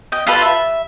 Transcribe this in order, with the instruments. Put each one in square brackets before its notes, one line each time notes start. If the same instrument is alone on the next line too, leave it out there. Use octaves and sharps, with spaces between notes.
[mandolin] D#5 G5
F4 G4 A4 B4
E5